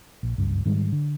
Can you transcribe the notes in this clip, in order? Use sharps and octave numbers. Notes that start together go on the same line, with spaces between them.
A#1
F#1 C#2 G2
G#2 D#3 G3 G#3
D3